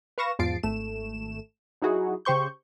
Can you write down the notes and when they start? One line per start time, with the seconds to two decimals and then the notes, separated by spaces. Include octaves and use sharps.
0.18 B4 F5 C#6 A#6 E7
0.39 E2 G#2 F3 A6 C7 D7
0.63 G#1 A3 E7
1.82 F#3 D#4 E4 F#4 G#4
2.25 C#3 G4 C5 C#6 G6